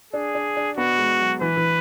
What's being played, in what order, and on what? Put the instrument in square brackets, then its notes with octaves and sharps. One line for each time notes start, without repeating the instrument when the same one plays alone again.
[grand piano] D4 [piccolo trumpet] G#4
[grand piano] D4
D4
[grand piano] B3 [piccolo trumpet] F#4
[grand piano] G#3
F#3
[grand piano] E3 [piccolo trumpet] B4
[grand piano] E3